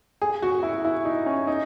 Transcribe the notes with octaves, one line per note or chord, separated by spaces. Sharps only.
G#4
F#4
E4
E4
D#4
C#4
D#4